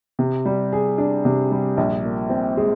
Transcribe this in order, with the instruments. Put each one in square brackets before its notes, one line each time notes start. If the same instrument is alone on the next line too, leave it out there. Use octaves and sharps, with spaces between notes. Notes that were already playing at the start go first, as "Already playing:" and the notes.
[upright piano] C3
G3
G#4
D4
C3
G3
A#1
A#2
C4
G#3